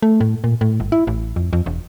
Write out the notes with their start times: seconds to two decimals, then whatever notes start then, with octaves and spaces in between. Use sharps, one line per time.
0.02 A3
0.20 A2
0.44 A#2
0.61 A2
0.80 G1
0.92 E4
1.07 A1
1.36 F2
1.53 F2
1.66 E1